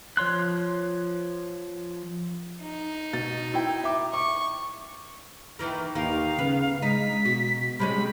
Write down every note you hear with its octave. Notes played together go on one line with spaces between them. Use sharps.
F3 C#5 C6 F#6
D#4
B2 A6
E4 G5
E5 D6
C#6 D6
D#3 E3 A#3
D#2 D#3 F5
C#3 B3
G#3 D#4 B6
B2 F#4
C3 G3 G#3 C#4 B5